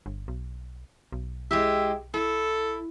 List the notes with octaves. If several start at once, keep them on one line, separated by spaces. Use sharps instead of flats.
G1
B1
B1
G#3 E4 G4 E5
E4 A4